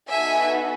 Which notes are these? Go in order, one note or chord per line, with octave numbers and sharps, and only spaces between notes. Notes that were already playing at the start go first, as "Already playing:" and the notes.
B3 D#4 F#4 A4 E5 G#5